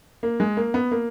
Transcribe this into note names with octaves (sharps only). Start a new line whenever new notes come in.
A#3
G#3
A#3
B3
A#3